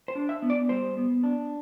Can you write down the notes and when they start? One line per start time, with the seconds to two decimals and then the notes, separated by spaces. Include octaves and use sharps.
0.08 C5
0.15 D4
0.29 E5
0.42 B3
0.50 D5
0.69 G3 C5
0.97 B3
1.23 D4